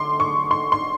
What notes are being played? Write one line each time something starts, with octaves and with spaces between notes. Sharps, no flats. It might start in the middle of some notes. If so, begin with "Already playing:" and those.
Already playing: D3 A3 C6 D6
C#6
C6
C6